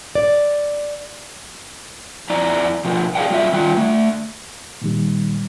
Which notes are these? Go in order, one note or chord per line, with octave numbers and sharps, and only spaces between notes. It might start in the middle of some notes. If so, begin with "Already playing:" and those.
D5
F2 E4 D5 A#5
B2 F3
G4 G#4 C5 D5 F5 G5
F#3 G3 F4 D5 E5
D#3 G3 F4 G5
D3 A3
A#2 D#3 G3